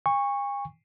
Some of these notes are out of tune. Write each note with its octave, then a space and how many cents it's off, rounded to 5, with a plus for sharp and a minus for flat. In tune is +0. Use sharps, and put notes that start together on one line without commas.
G#5 -45 C#6 -5